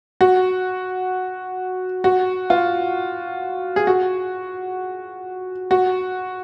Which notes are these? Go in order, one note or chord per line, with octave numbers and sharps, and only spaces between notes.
F#4
F#4
F4
G#4
F#4
F#4